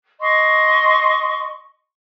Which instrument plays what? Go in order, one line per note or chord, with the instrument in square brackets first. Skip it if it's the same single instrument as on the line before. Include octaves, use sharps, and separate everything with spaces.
[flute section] D#5 C6 C#6